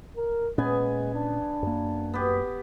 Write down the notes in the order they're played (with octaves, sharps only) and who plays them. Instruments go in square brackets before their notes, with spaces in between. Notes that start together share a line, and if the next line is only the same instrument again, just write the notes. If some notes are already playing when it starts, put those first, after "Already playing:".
[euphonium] A#4
[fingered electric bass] A#2 C#4 [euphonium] G#3 [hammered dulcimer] B3 G#5
[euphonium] D4
[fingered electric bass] F#2 A#3
[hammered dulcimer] B3 G4